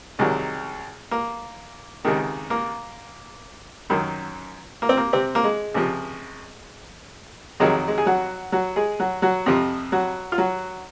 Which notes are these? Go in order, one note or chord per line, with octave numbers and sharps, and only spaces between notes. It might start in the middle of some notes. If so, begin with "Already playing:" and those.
C2 C3 D#3 F#3 G#3
A#3
C#2 C3 D#3 G#3
A#3
F#2 D#3 F#3
A#3
C4
A#3
C3 C4
A#3
G#3
C#2 C3 F3
F2 C3 D#3 F#3 G#3
G#3
G#4
F#3 F#4
F#3 F#4
G#3 G#4
F#3 F#4
F#3 F#4
F2 C3 F3
F#3 F#4
F4
F#3 F#4